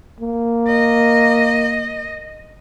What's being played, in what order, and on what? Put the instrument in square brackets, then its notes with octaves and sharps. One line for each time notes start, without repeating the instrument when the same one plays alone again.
[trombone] A#3
[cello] D#5